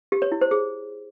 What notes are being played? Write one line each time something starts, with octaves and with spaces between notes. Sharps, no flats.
G4
C#5
E4
C5
G#4